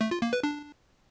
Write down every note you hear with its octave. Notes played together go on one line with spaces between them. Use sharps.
A3
F4
A#3
B4
D4